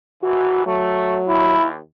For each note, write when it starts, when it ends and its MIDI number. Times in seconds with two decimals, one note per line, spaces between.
0.23 0.65 32
0.23 0.65 52
0.23 0.66 66
0.66 1.57 54
0.66 1.19 57
1.28 1.77 39
1.28 1.66 64